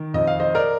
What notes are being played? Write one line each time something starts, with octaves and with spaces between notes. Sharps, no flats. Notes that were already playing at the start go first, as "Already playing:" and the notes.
Already playing: D#3
F2 D#5
F5
C5 D#5
A#4 D5